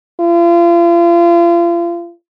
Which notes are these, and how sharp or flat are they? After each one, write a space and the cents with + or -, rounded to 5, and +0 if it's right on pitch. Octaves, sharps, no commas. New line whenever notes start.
F4 -35